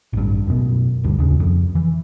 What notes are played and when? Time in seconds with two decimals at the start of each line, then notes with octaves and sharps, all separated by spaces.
0.13 A1 G2
0.47 F#2 B2
1.04 F#1 D2 G2
1.19 D#2 C#3
1.40 F2
1.75 E3